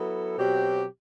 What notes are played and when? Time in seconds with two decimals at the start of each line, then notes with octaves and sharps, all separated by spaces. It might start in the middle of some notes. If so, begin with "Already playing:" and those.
Already playing: F#3 B3 E4 A4
0.38 B2 F#3 C4 G4